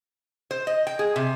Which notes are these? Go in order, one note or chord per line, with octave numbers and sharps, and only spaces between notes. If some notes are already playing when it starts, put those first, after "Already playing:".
C5
D#5
G5
G#4
C3